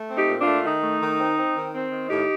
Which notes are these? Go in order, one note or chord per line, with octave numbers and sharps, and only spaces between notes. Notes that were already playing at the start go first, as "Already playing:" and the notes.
Already playing: A3
C4
D#4 G4
A#2
D4 F4
A3
D#3 D#4
A3
D#3
C4
C4
D#3
C4
D#3
A2 D#4 G4